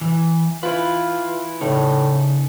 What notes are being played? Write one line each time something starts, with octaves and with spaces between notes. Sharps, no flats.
E3
E4 F4 B4
A2 C#3 D#4